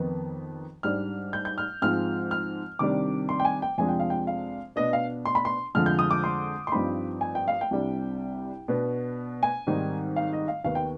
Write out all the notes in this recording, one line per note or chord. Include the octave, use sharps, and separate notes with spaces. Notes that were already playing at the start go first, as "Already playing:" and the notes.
Already playing: F2 D#3 B3 D#4
G#2 G3 D4 F6
G6
G6
F6
G#2 F3 G#3 C4 F6
F6
C3 D#3 G3 D4 D6
C6
G5
G#5
G5
F2 C3 F3 G#3 D4 G#5
G5
F5
G5
F5
B2 B3 D4 D#5
F5
C6
B5
C6
F2 D3 F3 G#3 F6
G6
D#6
D6
C6
C6
G2 F3 C4 D#4 B5
G#5
G5
F5
G5
C2 C3 G3 D4
B2 B3 D4
G#5
G#2 D#3 G3 C4 D#4
F5
D#5
F5
D#2 D#3 B3 F5
G5